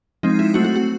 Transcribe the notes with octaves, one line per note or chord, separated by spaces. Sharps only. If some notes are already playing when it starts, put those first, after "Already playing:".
F3 G#3 C4 D#4
E4
F#3 A3 C4 F#4
F#4
F#4